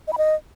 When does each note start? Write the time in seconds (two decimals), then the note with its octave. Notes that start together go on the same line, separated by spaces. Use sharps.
0.08 D#5
0.13 B5
0.18 D#5